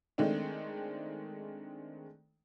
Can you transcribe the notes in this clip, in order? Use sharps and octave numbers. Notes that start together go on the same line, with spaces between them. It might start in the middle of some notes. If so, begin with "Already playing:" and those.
D#3 G#3 A3 C4 D4